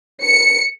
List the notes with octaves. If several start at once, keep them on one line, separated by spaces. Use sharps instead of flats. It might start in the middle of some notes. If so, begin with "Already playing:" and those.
C#7